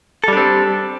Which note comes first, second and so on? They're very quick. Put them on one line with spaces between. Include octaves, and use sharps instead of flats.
A4 G3 D4 C4